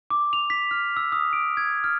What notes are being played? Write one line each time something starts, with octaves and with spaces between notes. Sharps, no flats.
D6
F7
B6
F6
E6
D#6
D7
G#6
F6